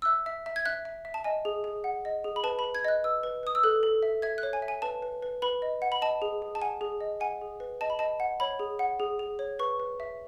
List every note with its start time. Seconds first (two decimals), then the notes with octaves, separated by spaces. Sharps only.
0.02 E6
0.05 E5 F#6
0.26 E5
0.46 E5
0.56 G#6
0.65 E5 F#6
0.85 E5
1.05 E5
1.14 A5
1.24 D#5 G#5
1.45 G#4
1.64 G#4
1.84 F#5
2.05 D#5
2.24 G#4
2.36 B5
2.44 B4 A5
2.59 B5
2.64 B4
2.75 G#6
2.85 D#5 F#6
3.04 B4 E6
3.23 B4
3.43 B4 D#6
3.55 E6
3.63 A4 F#6
3.83 A4
4.03 E5
4.22 E5 G#6
4.38 F#6
4.43 C#5
4.53 G#5
4.62 E5
4.68 G#5
4.82 B4 A5
5.02 B4
5.23 B4
5.42 B4 B5
5.62 D#5
5.82 F#5
5.92 B5
6.02 D#5 A5
6.22 G#4
6.42 G#4
6.55 A5
6.61 F#5 G#5
6.81 G#4
7.01 D#5
7.20 F#5 G#5
7.41 G#4
7.60 B4
7.81 D#5 A5
7.90 B5
7.99 D#5 A5
8.20 F#5
8.40 C#5 B5
8.59 G#4
8.79 F#5
9.00 G#4
9.19 G#4
9.39 C#5
9.59 B4 C#6
9.80 B4
10.00 E5